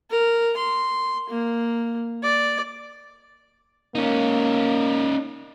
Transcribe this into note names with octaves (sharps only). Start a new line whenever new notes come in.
A#4
C6
A#3
D5
A#3 C#4 D#4